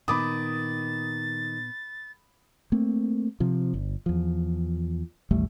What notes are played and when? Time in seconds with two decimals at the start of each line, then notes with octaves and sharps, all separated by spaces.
0.08 A#2 D#3 B3 B5 D6 D#6 A6
2.72 A3 A#3 C4
3.40 C3 F3
3.74 G1
4.06 E2 F3
5.31 A1 D#2 G3 A3